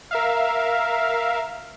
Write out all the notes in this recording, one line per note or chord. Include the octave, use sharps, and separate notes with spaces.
A#4 E5 F5